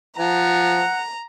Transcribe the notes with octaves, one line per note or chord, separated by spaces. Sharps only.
F3 F#5 A#5